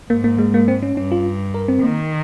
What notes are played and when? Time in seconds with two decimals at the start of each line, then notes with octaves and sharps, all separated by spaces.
0.10 G#2 A#3
0.24 A#3
0.38 G#3
0.54 A#3
0.68 C4
0.83 C#4
0.97 G2 C#4
1.12 F4
1.54 A#4
1.68 C4
1.83 D#3 A#3